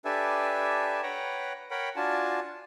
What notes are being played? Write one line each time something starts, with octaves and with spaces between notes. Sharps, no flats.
D4 G4 A4 B4 E5 G#5
B4 C#5 F#5 G5 A#5
A#4 C#5 F#5 G5 B5
D4 F4 F#4 G#5 A5